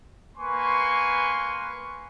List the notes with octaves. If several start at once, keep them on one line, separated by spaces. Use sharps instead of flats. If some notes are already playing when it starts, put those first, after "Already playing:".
A#3 B4 G#5 C6 C#6